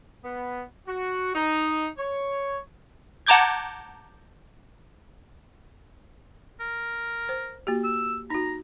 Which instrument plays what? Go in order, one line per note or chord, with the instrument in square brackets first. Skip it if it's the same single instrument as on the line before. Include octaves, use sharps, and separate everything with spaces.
[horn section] B3
F#4
D#4
C#5
[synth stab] F#5 A5 A#5 D6 G6 G#6
[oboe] A#4
[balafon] C5
A#3 F#4 G4
[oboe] E6
[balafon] D#4 F#4 [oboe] A#5